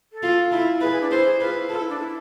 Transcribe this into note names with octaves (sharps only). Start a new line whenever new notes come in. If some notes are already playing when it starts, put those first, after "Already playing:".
A4
F4
E4
G#4 B4
G#4
D4
E4 C5
G#4
F4 B4
E4
F4 A4
E4
D4
E4